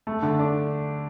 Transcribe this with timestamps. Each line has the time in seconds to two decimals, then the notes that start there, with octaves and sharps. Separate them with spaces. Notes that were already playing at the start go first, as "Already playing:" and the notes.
0.07 A3
0.22 D3
0.39 D4